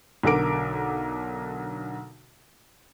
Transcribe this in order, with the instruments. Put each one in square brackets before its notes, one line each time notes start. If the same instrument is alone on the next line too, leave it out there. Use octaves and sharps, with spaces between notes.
[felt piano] B1 D3 A4 A#4 D6 D7